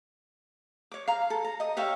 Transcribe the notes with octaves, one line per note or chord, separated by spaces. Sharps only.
C#5 D6
F5 A#5
A4
A#5
D#5 D#6
G4 C#5 E5 F5